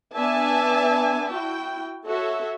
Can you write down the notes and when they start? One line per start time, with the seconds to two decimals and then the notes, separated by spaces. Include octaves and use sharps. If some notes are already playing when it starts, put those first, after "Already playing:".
0.16 B3 D4 D5 E5 G#5 A5
1.31 E4 F#4 G5
2.08 F#4 A4 C#5 E5